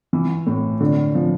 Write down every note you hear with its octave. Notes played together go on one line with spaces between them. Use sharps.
E3
A2
D3
F3